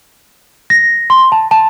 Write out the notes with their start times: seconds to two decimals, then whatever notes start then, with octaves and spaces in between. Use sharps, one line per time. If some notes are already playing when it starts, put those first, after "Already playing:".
0.70 A#6
1.10 C6
1.32 A5
1.51 A5